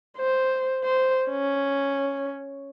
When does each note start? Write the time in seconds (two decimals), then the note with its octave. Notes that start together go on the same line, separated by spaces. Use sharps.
0.18 C5
0.84 C5
1.30 C#4